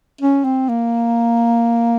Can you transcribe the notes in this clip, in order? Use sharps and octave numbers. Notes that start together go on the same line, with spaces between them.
C#4
C4
A#3